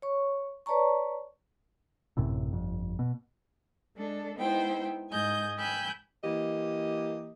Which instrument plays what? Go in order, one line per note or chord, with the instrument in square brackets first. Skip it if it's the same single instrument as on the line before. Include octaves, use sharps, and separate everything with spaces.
[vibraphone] C#5 C#6
B4 C#5 D5 A5 A#5 C#6
[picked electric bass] A1 F#2 A2 C3
G1 F2
B2
[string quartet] G#3 D4 A4
G#3 B3 D#4 E4 C5 G5
G#2 D#5 G#5 G6
G5 G#5 B5 E6 F#6 G6
[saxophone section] E3 A#3 G4 D#5